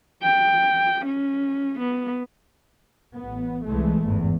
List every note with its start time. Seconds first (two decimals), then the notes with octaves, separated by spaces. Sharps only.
0.23 G5
1.05 C#4
1.79 B3
3.16 A1 B3
3.65 C2 E3 G#3 A3
4.02 G1 E2 G#2